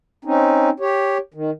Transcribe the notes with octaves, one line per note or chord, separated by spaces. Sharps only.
C4 C#4 D#4
G4 C#5
D#3